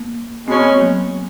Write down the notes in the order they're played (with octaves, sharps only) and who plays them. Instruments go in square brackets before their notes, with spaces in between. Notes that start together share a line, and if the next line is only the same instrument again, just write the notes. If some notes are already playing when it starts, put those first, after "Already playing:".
Already playing: [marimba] A#3
[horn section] B2 G#3 C#4 [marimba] C4
[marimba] B3
A#3
F#3